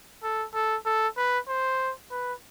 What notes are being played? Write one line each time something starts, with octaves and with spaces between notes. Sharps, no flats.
A4
A4
A4
B4
C5
B4